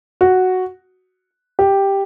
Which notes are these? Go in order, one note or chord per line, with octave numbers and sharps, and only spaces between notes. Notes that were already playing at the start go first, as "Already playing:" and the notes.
F#4
G4